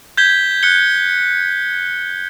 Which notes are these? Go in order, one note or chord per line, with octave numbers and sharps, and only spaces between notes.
G6 G#6 B6 G7
F#6 C#7 G7